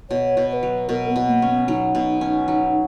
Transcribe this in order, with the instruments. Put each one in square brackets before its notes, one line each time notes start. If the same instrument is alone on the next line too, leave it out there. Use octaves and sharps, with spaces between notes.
[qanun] B2 [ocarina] C#5
[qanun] B2
[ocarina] C#5
B4
[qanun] F#3
[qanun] B2 [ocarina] A#4
[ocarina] B3
[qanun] B2
[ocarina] A#3
[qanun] C#4
[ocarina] B3
[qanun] F#3 [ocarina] D#4
[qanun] B2
C#4
F#3